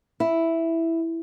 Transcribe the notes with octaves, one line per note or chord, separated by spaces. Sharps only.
E4